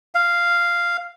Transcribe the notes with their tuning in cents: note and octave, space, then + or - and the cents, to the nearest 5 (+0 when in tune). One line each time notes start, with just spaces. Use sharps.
F5 -5